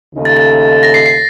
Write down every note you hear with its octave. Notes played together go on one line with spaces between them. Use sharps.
D#2 C#3 A3 D#4
A6
A6
A#6
C7
C7